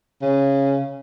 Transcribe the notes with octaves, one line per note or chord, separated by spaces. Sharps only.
C#3